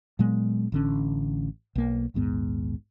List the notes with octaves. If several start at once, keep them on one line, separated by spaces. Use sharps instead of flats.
A#2 F#3 G#3 B3
A1 D3 C#4
B1 A#3
A#1 D#2 G#2 B3